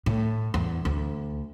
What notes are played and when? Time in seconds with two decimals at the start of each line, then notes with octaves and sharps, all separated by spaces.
0.06 A2
0.54 E2
0.85 D2